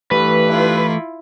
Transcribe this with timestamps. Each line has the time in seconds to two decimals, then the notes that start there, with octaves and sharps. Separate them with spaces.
0.11 G2 E3 A3 B4
0.49 E4 F4